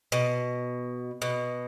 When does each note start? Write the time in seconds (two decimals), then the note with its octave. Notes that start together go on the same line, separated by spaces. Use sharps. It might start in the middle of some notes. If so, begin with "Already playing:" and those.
0.12 B2
1.22 B2